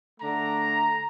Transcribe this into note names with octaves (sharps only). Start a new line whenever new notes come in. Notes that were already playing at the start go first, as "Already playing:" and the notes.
D3 A3 D4 A#5